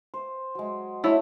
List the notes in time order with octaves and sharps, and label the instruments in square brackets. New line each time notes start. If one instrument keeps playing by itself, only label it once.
[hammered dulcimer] C5
F#3 G#3
[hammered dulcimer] A3 [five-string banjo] E4 C#5